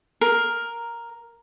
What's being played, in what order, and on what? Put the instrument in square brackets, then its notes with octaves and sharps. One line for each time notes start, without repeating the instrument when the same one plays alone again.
[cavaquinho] A#4